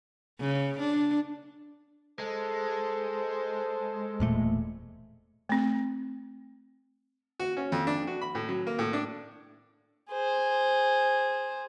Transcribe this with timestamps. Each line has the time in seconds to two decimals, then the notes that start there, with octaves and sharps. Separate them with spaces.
0.40 C#3
0.79 D4
2.19 G#3 A4 C5
4.20 E1 A#2 A3
5.49 A3 C4
7.40 F#4
7.57 C#4
7.72 F2
7.87 D4
8.07 F#4
8.21 B5
8.35 A2
8.49 F#3
8.67 A#3
8.79 A2
8.93 D4
10.11 G#4 C5